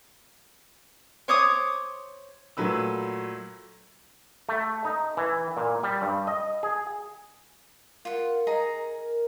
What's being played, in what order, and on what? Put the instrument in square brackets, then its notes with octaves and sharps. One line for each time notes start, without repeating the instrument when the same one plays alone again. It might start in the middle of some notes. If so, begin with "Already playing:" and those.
[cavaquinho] C5 C#5 D6 D#6
[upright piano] A#2 F#3 A3 B4 E6
[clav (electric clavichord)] A3
D#4
E3
A#2
G3
G2
D#5
G#4
[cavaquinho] F4 F#5 [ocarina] A#4
[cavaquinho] D#4 G#4 A#5